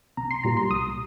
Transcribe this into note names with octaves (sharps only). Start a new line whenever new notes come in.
C2 A#5
C6
A#2 G3 A#3 A#5
C6
C2 D#6